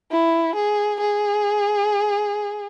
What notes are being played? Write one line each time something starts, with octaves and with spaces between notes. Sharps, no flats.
E4
G#4
G#4